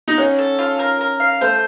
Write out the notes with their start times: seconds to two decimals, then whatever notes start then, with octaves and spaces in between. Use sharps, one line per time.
0.08 D#4
0.18 C#4 F#5
0.38 A4
0.59 F4
0.79 A#4
1.01 A#4
1.20 F5
1.41 A3 C5